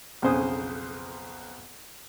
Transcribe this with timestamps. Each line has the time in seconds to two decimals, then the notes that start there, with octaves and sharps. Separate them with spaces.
0.22 B1 F2 C#3 C5 G#5 D#6